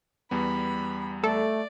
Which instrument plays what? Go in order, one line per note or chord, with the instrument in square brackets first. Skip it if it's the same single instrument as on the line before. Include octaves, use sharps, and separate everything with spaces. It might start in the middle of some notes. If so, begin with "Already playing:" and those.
[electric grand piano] E2 G3 B3 [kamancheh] B5
[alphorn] A3 [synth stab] A4 [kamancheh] D5